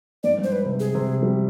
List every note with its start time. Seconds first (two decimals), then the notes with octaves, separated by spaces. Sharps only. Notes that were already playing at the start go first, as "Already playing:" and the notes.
0.23 G#2 D5
0.38 G2
0.44 C5
0.52 B4
0.66 C3
0.80 G#4
0.95 C3
1.23 G3